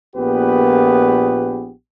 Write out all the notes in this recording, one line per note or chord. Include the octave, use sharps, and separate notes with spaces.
A#1 A#2 B3 G4 G#4 B4